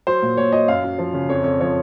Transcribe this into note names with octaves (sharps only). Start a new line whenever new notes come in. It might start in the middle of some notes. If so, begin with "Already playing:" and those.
F#3 C5
A#2
A#2 C#5
F#3 D#5
F#2 F5
F#2
F3
C#3
F2 C#5
F2 C#5
F3 C#5